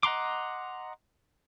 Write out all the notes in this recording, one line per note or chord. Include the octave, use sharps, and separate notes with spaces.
D#5 F#5 A#5 C6 D6